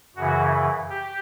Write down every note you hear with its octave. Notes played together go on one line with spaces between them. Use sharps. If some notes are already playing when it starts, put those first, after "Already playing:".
F#2 C#3 E3 F#4
G4